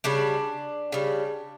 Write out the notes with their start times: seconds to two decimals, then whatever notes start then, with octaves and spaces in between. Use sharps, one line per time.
0.04 C#3 G3 D4
0.92 C#3 G3